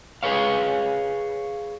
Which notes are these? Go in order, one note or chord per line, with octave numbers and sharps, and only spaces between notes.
G#4 B4 C#5 F5